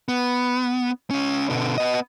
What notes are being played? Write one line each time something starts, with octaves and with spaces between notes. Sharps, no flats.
B3
C#2 C#4
B2 D3
B3 D#5